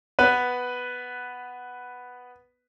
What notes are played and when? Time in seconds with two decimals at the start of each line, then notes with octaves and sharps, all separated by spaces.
0.19 B3 B4